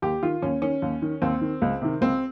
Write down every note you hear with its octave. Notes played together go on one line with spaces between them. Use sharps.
D#2 G4
D#3 F4
D#2 C#4
D#3 C#4
D#2
D#3
D#2 C4
D#3
C#2
C3 D#3
C#2 C4